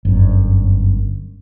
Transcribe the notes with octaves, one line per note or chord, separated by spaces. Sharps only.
G1 F#2